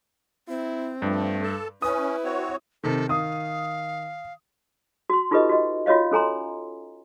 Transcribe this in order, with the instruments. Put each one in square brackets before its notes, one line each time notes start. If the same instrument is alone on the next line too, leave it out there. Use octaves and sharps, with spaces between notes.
[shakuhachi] C4 [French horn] E4
[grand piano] G2 [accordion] F3 [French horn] A3
[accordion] A4 A5
[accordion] C#4 [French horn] E4 [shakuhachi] B4 [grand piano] D#6
[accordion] C4 F#4 C#5
[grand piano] C3 D#3 [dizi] A4
[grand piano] D#3 [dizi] F5 [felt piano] D#6
[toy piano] F#4 C6
D#4 F4 G4 A4 B4 D#5
F#4 D#5
F4 F#4 C#5 D#5 F5
C#4 A4 G#5 A#5 C6